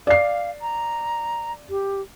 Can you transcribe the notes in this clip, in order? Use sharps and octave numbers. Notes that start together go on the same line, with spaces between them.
D5 F5 C7
A#5
G4